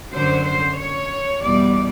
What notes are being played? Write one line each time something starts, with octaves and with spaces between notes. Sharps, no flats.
F#2 D3 F#3 C5
C5
C#5
E2 B2 G3 D5